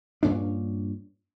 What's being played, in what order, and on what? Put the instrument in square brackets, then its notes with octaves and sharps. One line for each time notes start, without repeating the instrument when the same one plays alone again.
[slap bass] G2 A#2 C#4 D4